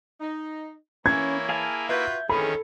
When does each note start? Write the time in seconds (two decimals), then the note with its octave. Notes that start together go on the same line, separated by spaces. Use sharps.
0.21 D#4
1.06 E3 A#3 C#4 E4 C#5 G#6
1.49 G#4 F5 A5
1.89 F4 F#4 B4 E5 G6
2.29 F2 D#3 E3 C#4 G#4 A4 B5